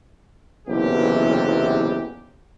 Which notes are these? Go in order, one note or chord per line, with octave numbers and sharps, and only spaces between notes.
F#1 B1 E2 C3 E3 G4